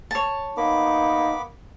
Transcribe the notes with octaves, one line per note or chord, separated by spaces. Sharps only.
C#5 A5
A#3 B3 D#4 B5 D6